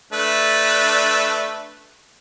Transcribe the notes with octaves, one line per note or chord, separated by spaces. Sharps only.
A3 D4 B4